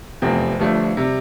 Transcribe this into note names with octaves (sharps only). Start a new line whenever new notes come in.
F1 E2 C3 F3 C4
G1 G2 F3 A3
C3 G3